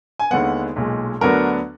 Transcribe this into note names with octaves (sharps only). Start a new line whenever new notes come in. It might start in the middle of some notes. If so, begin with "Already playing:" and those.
G#5
D#2 D3 G#3 B3 F#5
B1 A#2 G#3
D2 D3 F#3 B3 D4 A#4